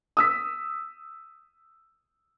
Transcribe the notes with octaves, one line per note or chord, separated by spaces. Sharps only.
D#6 E6 B6